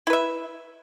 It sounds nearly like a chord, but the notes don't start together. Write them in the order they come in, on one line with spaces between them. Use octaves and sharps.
E4 B4 E5